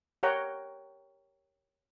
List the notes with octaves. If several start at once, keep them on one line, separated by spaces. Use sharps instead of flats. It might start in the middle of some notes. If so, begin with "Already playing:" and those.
G4 A#4 C#5 F#5 G5 A#5